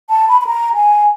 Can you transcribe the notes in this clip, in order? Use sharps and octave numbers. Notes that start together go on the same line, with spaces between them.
A5
B5
B5
A#5
G#5